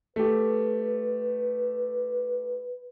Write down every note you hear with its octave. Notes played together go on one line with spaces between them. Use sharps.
A3 G4 B4